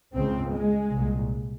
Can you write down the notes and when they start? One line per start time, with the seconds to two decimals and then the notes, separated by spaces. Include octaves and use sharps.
0.15 C#2 C#3 C4
0.52 G#3
0.91 C2 A#2